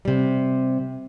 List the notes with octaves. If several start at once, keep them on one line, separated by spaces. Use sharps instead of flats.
C3 G3